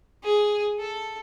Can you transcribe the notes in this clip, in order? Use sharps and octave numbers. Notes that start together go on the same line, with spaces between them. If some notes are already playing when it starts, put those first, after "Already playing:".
G#4
A4